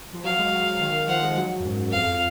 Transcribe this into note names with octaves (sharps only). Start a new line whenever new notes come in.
F3
F#3 F5
G#3
F#3
D#3
F3 F#5
G#3
F#3
F#2
G#2
F#2
F2 F5